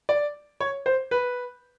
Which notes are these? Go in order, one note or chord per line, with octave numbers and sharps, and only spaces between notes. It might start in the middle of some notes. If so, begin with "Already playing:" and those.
D5
C#5
C5
B4